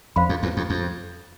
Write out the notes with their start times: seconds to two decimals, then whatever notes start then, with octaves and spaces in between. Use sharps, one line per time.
0.16 F2 C5 F5 B5
0.29 F2
0.43 E2
0.57 F2
0.70 F2